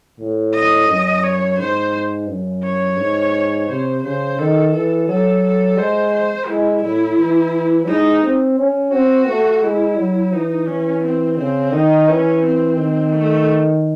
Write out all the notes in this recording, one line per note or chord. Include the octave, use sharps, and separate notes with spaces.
A2
D#5
F#2
C#5
G#2 C5
F#2
C#5
G#2
C3 C5
C#3 C5
D#3 A4
E3 A4
F#3 A4
A4
G#3 C5
C5
G#3 E4
A2 E4
E3
G#3 D#4
C4
C#4
C4 F#4
A3
G#3 E4
F#3
E3 D#4
E3 C#4
C4
C#3 C4
D#3 D#4
E3 C#4
C4
D#3
A3